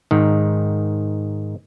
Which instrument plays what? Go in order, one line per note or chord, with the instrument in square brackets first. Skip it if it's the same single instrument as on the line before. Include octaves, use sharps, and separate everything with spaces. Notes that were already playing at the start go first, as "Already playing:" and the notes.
[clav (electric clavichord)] G#2 D#3